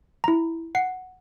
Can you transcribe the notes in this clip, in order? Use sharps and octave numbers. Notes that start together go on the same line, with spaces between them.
E4 A#5
F#5 C7